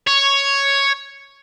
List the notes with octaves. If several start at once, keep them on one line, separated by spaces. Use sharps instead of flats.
C#5